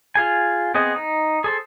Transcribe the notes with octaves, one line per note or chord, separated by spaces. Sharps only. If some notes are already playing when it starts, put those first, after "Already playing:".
F4 G#4 G#5
B3 C4 G#4 D#5
D#4
G#4 A4 C5